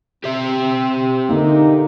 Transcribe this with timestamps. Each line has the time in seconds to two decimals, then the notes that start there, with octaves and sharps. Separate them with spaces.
0.24 C4 G4 E5
1.29 D3 A#3 D#4